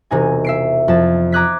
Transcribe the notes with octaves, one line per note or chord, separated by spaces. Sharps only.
E1 C3 D#4 G#5
E5 C7 D7
F2 A5
A#5 D6 D#6 F#6 G#6 B6